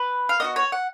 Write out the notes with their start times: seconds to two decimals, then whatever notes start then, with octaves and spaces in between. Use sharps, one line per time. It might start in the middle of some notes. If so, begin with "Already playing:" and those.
Already playing: B4
0.29 F5
0.40 B3 D#4 D#5
0.44 F#4
0.56 C#5
0.72 F#5